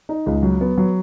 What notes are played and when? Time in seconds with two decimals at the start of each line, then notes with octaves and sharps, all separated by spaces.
0.09 D#4
0.26 C#2
0.43 F#3
0.61 B3
0.78 F#3